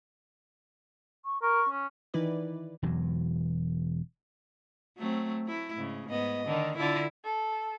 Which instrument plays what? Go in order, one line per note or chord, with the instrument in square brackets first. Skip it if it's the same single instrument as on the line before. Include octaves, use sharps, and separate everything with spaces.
[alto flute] C#6
[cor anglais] A#4 [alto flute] C#6
[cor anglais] C#4
[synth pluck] D#3 E3 D#4 E4 B4 D5
[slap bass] E1 E2 F#3
[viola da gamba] F#3 A3 C4
A3 E4
G#2 C#3
G#2 B3 D#5
D3 D#3
D3 E4 F4
[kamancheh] A4